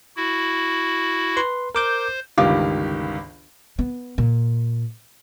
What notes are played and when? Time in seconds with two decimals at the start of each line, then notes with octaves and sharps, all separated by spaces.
0.16 E4 F#4
1.37 B4 C6
1.75 A#4 C5 D6 G6
2.38 G1 C#2 D#3 G4 F5 D6
3.79 B3
4.18 A#2